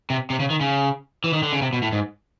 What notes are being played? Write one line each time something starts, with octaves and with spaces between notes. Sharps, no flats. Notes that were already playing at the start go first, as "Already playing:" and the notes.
C3
C3
C#3
D#3
C#3
E3
D#3
D3
C#3
C3
B2
A2
G#2